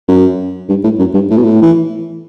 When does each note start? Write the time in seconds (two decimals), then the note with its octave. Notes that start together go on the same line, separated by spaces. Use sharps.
0.08 F#2
0.69 G2
0.84 A2
0.99 F#2
1.14 G2
1.30 A2
1.37 B2
1.43 A2
1.62 E3